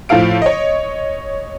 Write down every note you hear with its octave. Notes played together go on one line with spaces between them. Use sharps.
A2 F3 A4 F5 D7
C#5 D#5